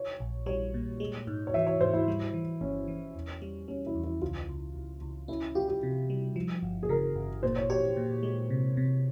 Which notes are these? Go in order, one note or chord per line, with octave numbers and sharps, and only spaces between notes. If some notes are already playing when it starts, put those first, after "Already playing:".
Already playing: C#5
A#1
G3 C#5
A#2
G#3
G#2
C#5
E3 E5
C#5
G#2 C5
E4
G3
E3
G1 C#4
E3
E2
G3
G3 C#4
E4
E2
E4
C#2 F4
C#2
C#2
C#2
C#4 E4
F4 G4
G4
C3
G3
F3
G1
G#4
C#3 A#4
G1
A#2 C5
C#5
G4 C#5
A#2
G#3
C3
C3